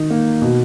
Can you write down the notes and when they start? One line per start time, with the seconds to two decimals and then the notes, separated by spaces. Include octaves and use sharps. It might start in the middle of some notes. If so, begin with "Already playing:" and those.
Already playing: D#3 D#4
0.10 A#3
0.42 B2